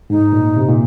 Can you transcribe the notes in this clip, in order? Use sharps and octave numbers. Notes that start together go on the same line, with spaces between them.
G#2 D#4
A#2
C3
A#2